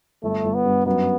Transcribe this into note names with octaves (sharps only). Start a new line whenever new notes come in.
G1 A3
G1
B3
G2
F#2 B3